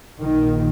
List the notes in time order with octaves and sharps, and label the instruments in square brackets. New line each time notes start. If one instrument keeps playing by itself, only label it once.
[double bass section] A#1 A#2 D#3